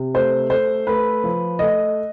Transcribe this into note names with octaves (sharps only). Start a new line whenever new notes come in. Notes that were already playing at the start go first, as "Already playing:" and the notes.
Already playing: C3
A3 C5
A3 C5
A3 B4
F3
A3 D#5